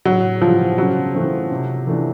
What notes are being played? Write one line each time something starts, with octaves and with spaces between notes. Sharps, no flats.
A2 F#3
E3 F3 G3
C#3 F#3
E3 A3 C4
C3
E3 A3 D4